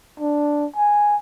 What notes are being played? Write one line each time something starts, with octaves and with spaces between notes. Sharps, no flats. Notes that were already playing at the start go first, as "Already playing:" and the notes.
D4
G#5